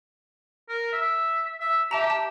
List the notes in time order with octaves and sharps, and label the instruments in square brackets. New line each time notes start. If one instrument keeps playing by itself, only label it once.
[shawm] A#4
E5
E5
[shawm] G4 [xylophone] E5 A5 A#5
[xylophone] A5